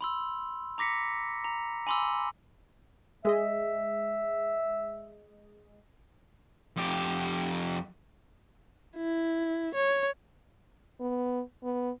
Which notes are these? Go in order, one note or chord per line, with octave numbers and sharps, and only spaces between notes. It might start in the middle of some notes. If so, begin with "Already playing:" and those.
B5 C6 E6
A#5 D6 A#6 B6 C#7
A#5
G#5 B5 C6 D6 E6
G#3 G#4 D#5 E5
F2 G4
E4
C#5
B3
B3